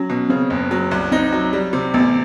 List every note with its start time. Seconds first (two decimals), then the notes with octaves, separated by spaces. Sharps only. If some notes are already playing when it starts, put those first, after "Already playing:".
Already playing: F#3 C#4
0.10 B2
0.30 C#3 C4
0.50 F#1
0.71 F#3
0.91 C2
1.12 C4 D#4
1.32 F#3
1.53 G3
1.73 C3
1.94 A1 B3